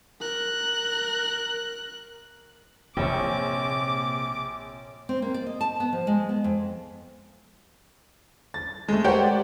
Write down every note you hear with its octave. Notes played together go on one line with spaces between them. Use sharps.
A#4 F#6
A#1 C3 A#3 C#5 G5 D6
C4
A#3
D5
D#5
A5
B3
F3
G#3
B3
F2
A6
G#3 A3
G4 A#4 C5 C#5 F#5 G5
D5